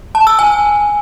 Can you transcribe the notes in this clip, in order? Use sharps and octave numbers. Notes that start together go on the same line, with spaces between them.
A5
E6
G#5